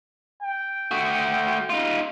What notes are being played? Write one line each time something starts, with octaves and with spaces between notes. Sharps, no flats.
G5
A3 F#4
D#4 F4